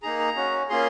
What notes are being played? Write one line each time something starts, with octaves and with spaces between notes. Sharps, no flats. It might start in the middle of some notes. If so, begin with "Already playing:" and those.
A#3 D#4 G#4 A#5
A#5
C#4 F#4
A#3 C#4 F4 G#4 C6